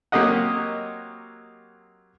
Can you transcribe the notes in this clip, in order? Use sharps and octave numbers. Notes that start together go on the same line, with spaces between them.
F#3 A#3 C4 G4 D#5 F#5